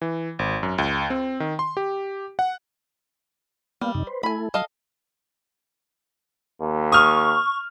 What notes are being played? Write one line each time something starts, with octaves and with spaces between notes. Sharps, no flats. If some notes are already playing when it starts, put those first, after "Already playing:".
E3
G#1
F#2
C#2
C4
D#3
C6
G4
F#5
G3 A#3 B3 F5
F#2 C3 D#4
B4 C5
A3 E4 A4 G#5 B5
F#3 A4 D#5 F5
D#2
C#6 D#6 F6